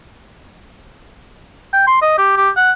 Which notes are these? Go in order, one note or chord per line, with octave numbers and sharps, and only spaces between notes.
G5
C6
D#5
G4
G4
F#5